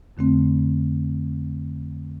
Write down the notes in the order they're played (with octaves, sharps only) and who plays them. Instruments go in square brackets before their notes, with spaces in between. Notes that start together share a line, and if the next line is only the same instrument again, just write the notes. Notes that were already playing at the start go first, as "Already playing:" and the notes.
[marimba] F2 D3 A3 C4